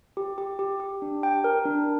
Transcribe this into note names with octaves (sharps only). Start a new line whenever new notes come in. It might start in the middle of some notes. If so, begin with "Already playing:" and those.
G4
G4
G4
G4
D4
G5
A#4
D4